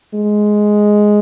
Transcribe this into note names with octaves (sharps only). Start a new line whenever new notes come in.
G#3